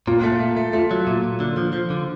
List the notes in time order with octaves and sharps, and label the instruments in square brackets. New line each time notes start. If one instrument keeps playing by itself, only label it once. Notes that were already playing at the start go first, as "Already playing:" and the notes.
[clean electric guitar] A#2 [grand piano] F4
[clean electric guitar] A3
A3
A3
[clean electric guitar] A3 [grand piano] F4
[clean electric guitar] F#3
A#2
A#2
D3
F3
F3
D3